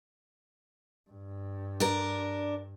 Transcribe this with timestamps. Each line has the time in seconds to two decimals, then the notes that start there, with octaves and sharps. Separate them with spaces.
1.10 G2
1.80 D4 A#4